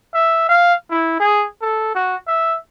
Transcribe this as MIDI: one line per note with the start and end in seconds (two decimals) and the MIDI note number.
0.14 0.47 76
0.49 0.74 77
0.90 1.15 64
1.20 1.45 68
1.62 1.94 69
1.95 2.16 66
2.28 2.56 76